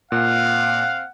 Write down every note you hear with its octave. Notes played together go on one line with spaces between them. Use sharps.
A#2 C4 F5 F#5